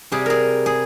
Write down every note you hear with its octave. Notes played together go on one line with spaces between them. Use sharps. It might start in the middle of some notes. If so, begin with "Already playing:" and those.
C3 G3 G#4
G#4 A#4
G#4